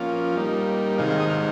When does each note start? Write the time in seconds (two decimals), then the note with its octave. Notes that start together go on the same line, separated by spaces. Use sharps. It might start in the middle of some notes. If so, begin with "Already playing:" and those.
Already playing: F3 A#3 C#4 F4
0.37 G3 A#3 D#4
0.98 C3 D#3 G#3 D#4 F5
1.10 F5
1.20 D#6
1.30 F6